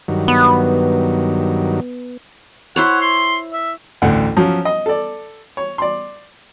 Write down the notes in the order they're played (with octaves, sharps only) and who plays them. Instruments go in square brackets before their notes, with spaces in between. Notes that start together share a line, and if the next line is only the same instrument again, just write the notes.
[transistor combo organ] G2 D#3 F#3
[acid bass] B3
[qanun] E4 C5 C#5 [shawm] F#5
[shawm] C6
E5
[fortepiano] A1 D2 F#5
F3 F#3 C#4
D#5
A4 D5
C#5
D5 C6